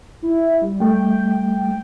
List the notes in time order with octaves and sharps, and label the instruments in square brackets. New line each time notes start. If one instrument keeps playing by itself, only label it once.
[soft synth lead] E4
G3
[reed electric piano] G3 A3 [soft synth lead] G5